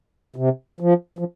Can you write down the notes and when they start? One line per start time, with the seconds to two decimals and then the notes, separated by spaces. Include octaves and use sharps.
0.36 C3
0.80 F3
1.19 F3